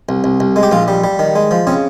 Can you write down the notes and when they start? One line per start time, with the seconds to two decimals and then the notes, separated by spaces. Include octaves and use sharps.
0.09 C2
0.24 C2
0.40 C2
0.56 G#3
0.63 G4
0.71 A#1 F4
0.88 G3
1.04 G3
1.19 D#3
1.35 G#3
1.51 F3
1.67 C#3 C4